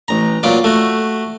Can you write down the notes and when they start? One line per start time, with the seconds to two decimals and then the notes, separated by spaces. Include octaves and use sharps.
0.08 A1 A#5
0.43 A#2 F#3 F4 D5
0.64 A3 F#4